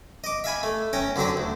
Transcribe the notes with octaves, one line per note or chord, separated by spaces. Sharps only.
D#5 D6
E5 F5 G#5 B5
A3
C#4 C#5 G5 A#5
D3 F#3 C4 D4 C5
D2